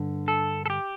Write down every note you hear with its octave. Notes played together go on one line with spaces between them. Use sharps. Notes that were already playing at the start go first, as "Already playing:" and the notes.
Already playing: G2 D3
A4
A4
G4